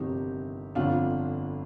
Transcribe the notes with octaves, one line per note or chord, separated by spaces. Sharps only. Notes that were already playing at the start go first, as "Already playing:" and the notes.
Already playing: G1 F2 C3 D#3 D#4 G4
G1 F2 D3 D4 F4